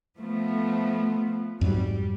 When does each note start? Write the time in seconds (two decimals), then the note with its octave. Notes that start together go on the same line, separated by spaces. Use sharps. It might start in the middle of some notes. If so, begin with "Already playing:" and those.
0.17 F3 A3 B3
1.61 F2 G#2 F#3 G3